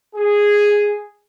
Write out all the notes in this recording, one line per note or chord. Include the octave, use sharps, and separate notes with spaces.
G#4